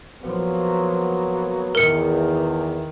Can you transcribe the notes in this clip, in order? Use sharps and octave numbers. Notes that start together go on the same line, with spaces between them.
F3 F#3 A#3 B3
E2 D#3 A#4 C#7